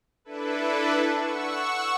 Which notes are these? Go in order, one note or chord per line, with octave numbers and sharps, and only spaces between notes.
D4 E4 A4 B4
F#5 C#6 E6